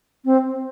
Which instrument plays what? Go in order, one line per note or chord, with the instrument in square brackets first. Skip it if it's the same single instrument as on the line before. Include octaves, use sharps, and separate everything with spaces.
[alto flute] C4